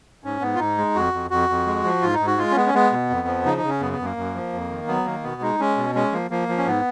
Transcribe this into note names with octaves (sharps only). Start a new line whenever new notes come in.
G#2 C#4
G#2 B3
F4
G#2 D#4
G#3
F2 F#4
F2
F2 F#4
F2
G#3
F3
G#2 F4
D#4
G#2
F#4
G#3 F4
C#4
G#3 B3
C#4
G#3 B3
B2
F2
F3
C#3 D#4
D#4
C#3
C#4
F#2 B3
B3
F#2
A#3
F#2
F3
F2
D#3
F#3 B3
D#3 A#3
B2 B3
G#3 D#4
G#3 C#4
B2
G#3 C#4
F3 A#3
F3 A#3
F3
C#4
G#2 B3